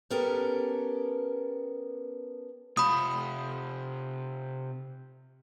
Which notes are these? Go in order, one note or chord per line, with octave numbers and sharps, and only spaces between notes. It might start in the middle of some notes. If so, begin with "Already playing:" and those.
B3 C#4 G4 A4 A#4
C3 F4 B5 D#6